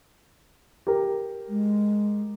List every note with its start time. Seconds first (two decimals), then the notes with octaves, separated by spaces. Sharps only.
0.87 G4 A#4
1.49 G#3